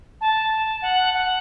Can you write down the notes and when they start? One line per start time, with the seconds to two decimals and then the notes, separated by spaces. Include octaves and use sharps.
0.21 A5
0.82 F#5
1.14 F#5